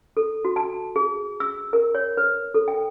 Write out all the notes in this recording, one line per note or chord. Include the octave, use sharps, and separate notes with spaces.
A4
F#4
A5
G#4
E6
A#4
C#5
B4
A4
G5